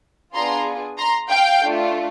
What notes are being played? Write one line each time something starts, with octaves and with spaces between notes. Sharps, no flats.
B3 D4 F4 G#4 A#5 C6
A#5 C6
F5 G5
A3 D4 F4